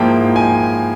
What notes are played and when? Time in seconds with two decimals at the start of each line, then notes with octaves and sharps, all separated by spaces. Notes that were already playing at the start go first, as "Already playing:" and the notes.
Already playing: G#2 F3 A#3 E4 G5
0.36 G#5